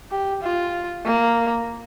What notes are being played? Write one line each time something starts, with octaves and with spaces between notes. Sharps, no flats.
G4
F4
A#3